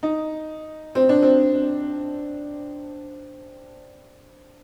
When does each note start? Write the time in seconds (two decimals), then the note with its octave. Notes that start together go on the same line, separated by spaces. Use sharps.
0.03 D#4
0.95 C4
1.09 D4
1.22 C4